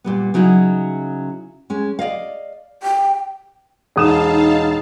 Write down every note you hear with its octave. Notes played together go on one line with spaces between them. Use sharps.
A#2 G3 B3
C#3 F#3 D#4 E4
G#3 C#4
D5 D#5 F5
G5
E1 D#4 F5 A5 D#6 E7